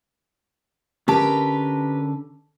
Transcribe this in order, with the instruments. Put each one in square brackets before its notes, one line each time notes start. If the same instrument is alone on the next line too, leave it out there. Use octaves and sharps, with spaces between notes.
[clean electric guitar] D3 C#4 A5 [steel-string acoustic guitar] G4 A#4 B4